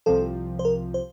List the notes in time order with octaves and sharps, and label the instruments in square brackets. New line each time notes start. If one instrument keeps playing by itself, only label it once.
[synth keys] C2 C3 F3 [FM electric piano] A4
[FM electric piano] C5
A#4
C5